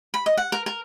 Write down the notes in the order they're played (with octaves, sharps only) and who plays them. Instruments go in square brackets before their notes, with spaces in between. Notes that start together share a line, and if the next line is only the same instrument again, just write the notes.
[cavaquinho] B5
D#5
F#5
A#4
A#4